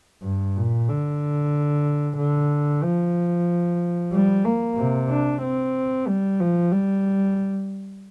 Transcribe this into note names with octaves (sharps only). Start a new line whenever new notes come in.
G2
A#2
D3
D3
F3
G3
A#3
C3
D4
C4
G3
F3
G3